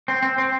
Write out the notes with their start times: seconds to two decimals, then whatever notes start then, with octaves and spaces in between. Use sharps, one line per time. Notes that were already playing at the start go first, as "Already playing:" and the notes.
0.08 C4
0.23 C4
0.38 C4